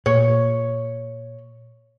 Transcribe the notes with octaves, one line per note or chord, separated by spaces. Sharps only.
A#2 C#5